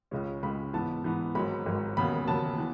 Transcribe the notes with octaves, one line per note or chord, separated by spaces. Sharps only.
C#2 C#3 G#3 C#4
C#2 C#3 G#3 C#4 B5
G#2 E3 B3 A5
G#2 E3 B3
G#1 G#2 F#3 B5
G#1 G#2 F#3
E1 D#2 C#3 F#3 B3 B5
E1 D#2 C#3 F#3 B3 A5
E3 B3